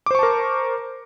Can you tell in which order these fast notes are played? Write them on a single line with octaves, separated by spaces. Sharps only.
D6 C5 C#6 A5 A#4